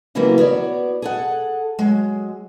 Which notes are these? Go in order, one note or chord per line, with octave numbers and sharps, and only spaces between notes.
C#3 E3 F#3 G3 A#3 B3
B3 F#4 C#5 D5
G#4 A4 F#5
F#3 G#3